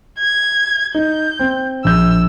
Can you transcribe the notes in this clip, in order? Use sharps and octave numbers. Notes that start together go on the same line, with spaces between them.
G#6
D#4 G6
C4
A#1 E6 G6